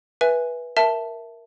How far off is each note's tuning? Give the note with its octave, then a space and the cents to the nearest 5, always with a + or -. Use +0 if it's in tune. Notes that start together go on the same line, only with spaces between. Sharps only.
B4 -15 E5 +0 G#5 +0
A#4 +5 E5 +0 A5 +0